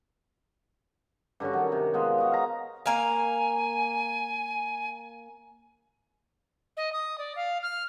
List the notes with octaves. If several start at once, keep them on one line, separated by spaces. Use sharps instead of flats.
G2 D3 C#4 F#4
D#3 F#3
C3
G#3 B3 F4
F#4 D#5
F5 A#5
A#3 F5 G#5
D#5
D#6
D5
F5
F6